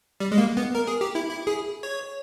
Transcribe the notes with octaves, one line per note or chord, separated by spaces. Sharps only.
G3
G#3
A#3
B3
A#4
G#4
G4
E4
E4
G#4
C#5